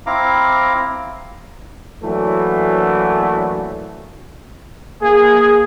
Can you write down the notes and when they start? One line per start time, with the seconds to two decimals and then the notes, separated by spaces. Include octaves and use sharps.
0.06 C4 E4 F5 A#5 D6
2.02 E3 F#3 A3 A#3 D4
5.02 A#3 G#4